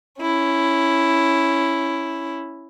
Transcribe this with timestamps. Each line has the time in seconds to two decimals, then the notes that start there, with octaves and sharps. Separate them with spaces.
0.22 C#4 E4